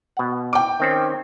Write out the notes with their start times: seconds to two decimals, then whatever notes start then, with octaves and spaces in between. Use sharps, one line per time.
0.17 B2 F#5
0.53 G5 D6
0.80 D#3 C4 C#4